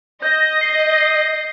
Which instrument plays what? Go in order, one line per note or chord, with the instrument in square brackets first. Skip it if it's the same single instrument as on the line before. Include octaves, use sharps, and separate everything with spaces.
[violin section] D#5 [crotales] G6
[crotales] C7
C7